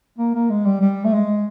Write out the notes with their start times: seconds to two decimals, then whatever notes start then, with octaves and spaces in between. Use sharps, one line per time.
0.19 A#3
0.35 A#3
0.50 G#3
0.66 G3
0.81 G3
1.05 A3
1.13 G#3